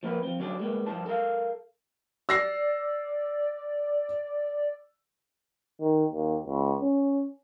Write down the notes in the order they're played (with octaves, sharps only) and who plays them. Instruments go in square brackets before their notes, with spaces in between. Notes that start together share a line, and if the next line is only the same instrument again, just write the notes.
[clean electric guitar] F3 A#3 A#4 B4
F3 C4
F#3 G3 C#4 D4 A4 D5
G3 G#3 A#3 B3
G2 F3 G3 E4 A5
A4 A#4 D#5 F5
[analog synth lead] D5 [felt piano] E6 A#6 C7
[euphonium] D#3
D#2
C#2
C#4